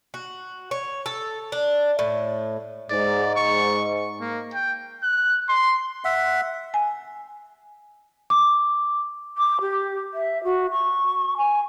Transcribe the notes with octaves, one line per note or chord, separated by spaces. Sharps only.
F#4
C#5
A4
D4
A2
G#2 D5
C#6
A#3
G5
F#6
C6
E5 F#5
G#5
D6
D6
G4
E5
F#4
C#6
G#5